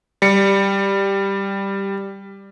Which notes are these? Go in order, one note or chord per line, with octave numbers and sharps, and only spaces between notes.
G3 C#7